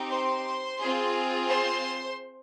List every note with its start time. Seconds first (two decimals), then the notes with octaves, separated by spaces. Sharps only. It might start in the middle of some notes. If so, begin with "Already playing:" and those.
Already playing: C4 D#4 G4
0.10 C5 C6
0.80 C4 F4 G#4
1.48 C5 C6